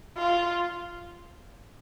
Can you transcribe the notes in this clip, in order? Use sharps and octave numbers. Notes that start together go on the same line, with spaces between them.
F4